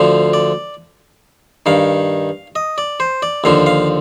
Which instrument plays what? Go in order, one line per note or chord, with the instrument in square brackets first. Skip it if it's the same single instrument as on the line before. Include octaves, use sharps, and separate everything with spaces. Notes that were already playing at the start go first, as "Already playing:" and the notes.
Already playing: [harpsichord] D2 D3 F3 F5
D5
G2 D#3 F5
D#5
D5
C5
D5
D#2 D3 F3 F5
F5